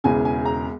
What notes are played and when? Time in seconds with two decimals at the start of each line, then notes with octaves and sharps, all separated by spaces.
0.04 E1 E2 C#3 G#5
0.25 G#5
0.46 A#5